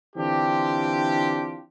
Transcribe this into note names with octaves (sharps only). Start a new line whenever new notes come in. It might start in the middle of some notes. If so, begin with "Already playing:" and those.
D3 E3 C4 D4 F4 G4